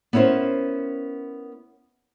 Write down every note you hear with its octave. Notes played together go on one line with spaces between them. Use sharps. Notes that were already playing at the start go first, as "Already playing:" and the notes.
B3 C#4 E4 A#4 C5